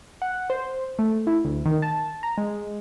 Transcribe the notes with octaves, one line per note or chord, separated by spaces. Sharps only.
F#5
C5
A3
E4
D2
D#3
A5
A#5
G#3